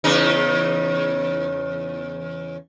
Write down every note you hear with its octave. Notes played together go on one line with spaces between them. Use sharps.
E2 C#3 D#4